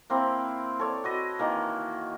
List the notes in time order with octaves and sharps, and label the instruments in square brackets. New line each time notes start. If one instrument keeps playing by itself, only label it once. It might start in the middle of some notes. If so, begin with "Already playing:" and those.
[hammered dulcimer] A#3 C4 E4
A4 C#5 D5
F#4 B4 D#5
D#3 E3 A#3